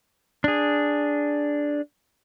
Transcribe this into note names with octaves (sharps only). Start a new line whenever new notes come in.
D4 G#4